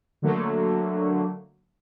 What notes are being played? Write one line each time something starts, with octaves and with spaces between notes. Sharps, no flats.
D3 F#3 A3 A#3